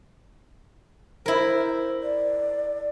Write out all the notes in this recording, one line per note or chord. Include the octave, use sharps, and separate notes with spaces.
E4 A#4 C5
D5